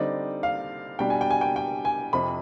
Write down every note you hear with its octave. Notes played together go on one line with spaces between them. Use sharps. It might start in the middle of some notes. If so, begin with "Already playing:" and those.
Already playing: D3 G3 C4 D#4 D5
F5
B2 G3 D4 G5
G#5
G5
G#5
G5
G5
G#5
F2 C3 F3 B5